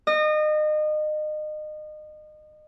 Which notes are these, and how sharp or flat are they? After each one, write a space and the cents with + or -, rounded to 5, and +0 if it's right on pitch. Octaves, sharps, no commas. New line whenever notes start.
D#5 -30